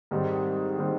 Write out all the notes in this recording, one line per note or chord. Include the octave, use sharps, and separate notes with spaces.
G#2 D#3 G3 C4
D#3 G3 C4